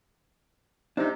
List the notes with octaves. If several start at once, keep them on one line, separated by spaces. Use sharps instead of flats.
C3 D4 D#4